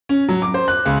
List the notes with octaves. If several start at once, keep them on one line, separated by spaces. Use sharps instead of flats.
C#4
F#3
D6
C5
F#6
C#2